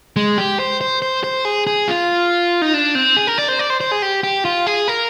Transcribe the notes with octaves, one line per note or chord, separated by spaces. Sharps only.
G#3
G4
C5
C5
C5
C5
G#4
G#4
F4
D#4
D4
C4
G#4
A#4
D5
C5
D5
C5
C5
G#4
G4
G4
F4
G#4
A#4